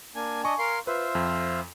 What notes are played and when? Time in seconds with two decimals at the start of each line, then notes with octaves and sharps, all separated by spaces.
0.15 A#3 D4 G#5
0.44 D4 D#5 G#5 C#6
0.59 A#4 F5 C6
0.87 F4 B4 C5 E5
1.15 F2